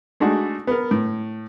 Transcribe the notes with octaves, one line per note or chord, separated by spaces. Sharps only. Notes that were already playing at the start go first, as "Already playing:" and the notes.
G#3 A3 D4 D#4 F#4
B3 A#4
A2